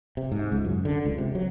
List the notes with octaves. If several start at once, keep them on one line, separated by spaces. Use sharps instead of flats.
C3
G#2
C#2
F#2
D3
C#2
C3
F#3